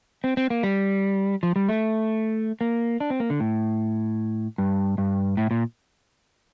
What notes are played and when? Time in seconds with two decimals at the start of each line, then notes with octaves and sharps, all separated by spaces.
0.24 C4
0.37 C4
0.50 A#3
0.63 G3
1.43 F3
1.56 G3
1.68 A3
2.61 A#3
3.00 D4
3.10 C4
3.20 A#3
3.30 D3
3.40 A2
4.58 G2
4.98 G2
5.37 A2
5.51 A#2